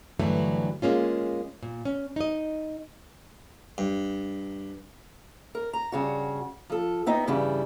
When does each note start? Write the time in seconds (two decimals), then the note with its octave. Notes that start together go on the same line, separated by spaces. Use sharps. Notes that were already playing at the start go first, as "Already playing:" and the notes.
0.19 G2 D3 E3 F#3 A3
0.82 G#3 A#3 C#4 F4
1.63 A#2
1.85 C#4
2.16 D#4 D#5
3.78 G2
5.55 A#4
5.73 A#5
5.92 G2 C#3 F#4
6.70 F3 A4
7.06 B3 C4 D#4 E4 D#5
7.27 G2 C#3 E3 G3 E4